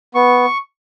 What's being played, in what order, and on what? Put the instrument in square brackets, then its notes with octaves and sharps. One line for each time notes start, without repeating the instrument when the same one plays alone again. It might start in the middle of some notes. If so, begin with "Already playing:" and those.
[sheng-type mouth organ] B3 C#6